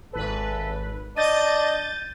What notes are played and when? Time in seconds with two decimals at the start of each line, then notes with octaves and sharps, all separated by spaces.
0.13 G#1 A4 B4
1.16 D4 D#5 G6 A6 D#7